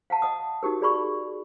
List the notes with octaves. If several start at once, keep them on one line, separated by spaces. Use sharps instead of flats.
F5 F#5 A5
D#5 F#5 D#6
D#4 F#4 G4 A#4
G#4 D5 B5 C#6